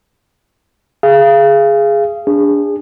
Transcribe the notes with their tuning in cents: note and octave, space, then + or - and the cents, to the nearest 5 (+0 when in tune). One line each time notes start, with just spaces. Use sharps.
G#4 +0 F5 -30
D4 -15 G#4 -30